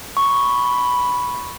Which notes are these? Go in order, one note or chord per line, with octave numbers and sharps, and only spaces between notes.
B5 C#6